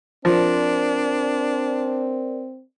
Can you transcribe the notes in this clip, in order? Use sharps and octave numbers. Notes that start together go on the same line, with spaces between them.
F3 C4 D4 A#4 D5